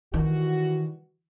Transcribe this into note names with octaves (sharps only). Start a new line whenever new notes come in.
D#3 E3 G3 F#4